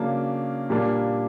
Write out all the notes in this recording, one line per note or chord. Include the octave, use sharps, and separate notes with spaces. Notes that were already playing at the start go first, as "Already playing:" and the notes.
Already playing: C#3 F#3 A#3 D4
A#2 G3 A#3 D4